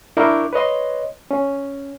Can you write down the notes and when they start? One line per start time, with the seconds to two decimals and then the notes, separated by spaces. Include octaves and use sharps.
0.17 D4 E4 A#4 C#6 D6 G6
0.53 B4 C#5 D#5 C6
1.31 C#4